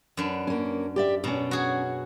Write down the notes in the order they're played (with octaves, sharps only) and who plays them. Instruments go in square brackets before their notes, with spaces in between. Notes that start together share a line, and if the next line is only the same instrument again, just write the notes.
[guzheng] F#2 D4 B4
[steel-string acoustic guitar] A#3 C#4
G4 D5 E5
[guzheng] B2 D4 [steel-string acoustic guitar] C#4 A#5
[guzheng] F#4 G#4 C#5